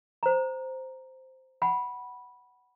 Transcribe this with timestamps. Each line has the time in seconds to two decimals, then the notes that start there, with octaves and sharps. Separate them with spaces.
0.23 C5 A#5
1.62 F#5 G#5 B5